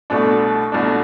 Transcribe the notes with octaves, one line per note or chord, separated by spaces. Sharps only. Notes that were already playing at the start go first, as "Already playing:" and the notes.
C2 B2 A3 D4
C2 B2 A3 D4